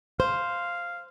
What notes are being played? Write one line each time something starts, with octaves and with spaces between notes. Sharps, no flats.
C5 F5